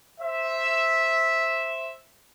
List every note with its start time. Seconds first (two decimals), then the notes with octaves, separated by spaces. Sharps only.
0.21 C5 E5